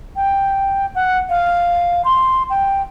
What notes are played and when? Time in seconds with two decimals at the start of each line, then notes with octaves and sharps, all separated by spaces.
0.16 G5
0.95 F#5
1.29 F5
2.05 C6
2.50 G5